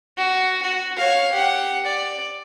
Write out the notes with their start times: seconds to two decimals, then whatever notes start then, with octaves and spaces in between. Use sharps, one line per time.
0.18 F#4
0.63 F#4
0.97 C#5 F5
1.32 G4 F#5
1.86 D5